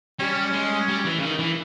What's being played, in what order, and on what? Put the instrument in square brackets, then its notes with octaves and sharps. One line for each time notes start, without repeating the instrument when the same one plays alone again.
[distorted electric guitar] G3 [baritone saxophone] C#4
[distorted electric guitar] G#3
G3
E3
C#3
D#3
E3